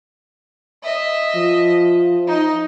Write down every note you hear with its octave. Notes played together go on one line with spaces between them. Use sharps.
D#5 E5
F3
D#4 D#5